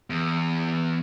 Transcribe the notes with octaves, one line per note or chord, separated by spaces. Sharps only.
E2